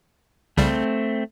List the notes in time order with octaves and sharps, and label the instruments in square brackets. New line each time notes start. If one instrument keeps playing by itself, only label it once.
[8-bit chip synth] C2 C#3 G3 [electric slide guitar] A3 C4